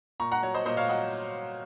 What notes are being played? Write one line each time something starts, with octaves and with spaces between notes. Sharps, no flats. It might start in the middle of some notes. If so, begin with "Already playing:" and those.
A#2 A#5 C#6
F#5 A#5
F#3 C#5
C5 D#5
A#2 C5 D#5
C#5 F5
F#3 D#5 F#5